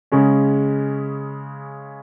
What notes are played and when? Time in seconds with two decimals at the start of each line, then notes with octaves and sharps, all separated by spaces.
0.12 C#3 G#3 C#4